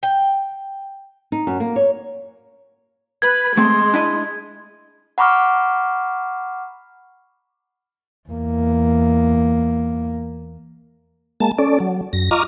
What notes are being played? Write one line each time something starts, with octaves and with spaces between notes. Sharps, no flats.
G5
D#4
F#2
A#3
C#5
B4 G#6
G#3 A3 C4 C6
D4 E4 D#5
F#5 A#5 B5 C#6 D6 F6
E2 A#3
G#3 A#3 A5
C#4 A4 D5
F#3
F#2 A#6
F4 D#5 A#5 C#6 D6 F6